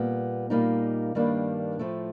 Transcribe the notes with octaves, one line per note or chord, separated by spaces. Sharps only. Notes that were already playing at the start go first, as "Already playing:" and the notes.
Already playing: A#2 G3 B3
A#2 G3 A#3 D#4
G2 D#3 G3 A#3 D4
A2 F3 A3